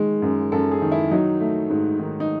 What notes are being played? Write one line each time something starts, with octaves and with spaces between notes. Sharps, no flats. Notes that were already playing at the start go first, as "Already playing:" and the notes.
Already playing: D#3 G#3
F#2
F#2 A4
G#4
D#3
E4
F#3 D#4
A3
G#2
D#3
D#4